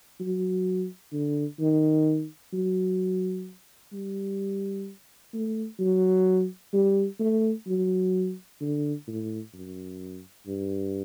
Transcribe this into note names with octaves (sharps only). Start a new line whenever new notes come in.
F#3
D3
D#3
F#3
G3
A3
F#3
G3
A3
F#3
D3
A2
F#2
G2